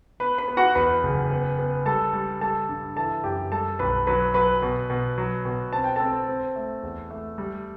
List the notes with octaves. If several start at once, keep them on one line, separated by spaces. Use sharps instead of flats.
B3 B4 B5
B4 B5
B3
F#4 F#5
E2 B4 B5
F#1
B3
B3
G3 A4 A5
G3
G3 A4 A5
G2
E3 A4 A5
F#2 G4 G5
G3 A4 A5
B1 B4 B5
F#3 B4 B5
F#3 B4 B5
B2
B2
F#3
B2
C4 A5
G5
C4 A4 A5
C4
A3
E2
A3
G3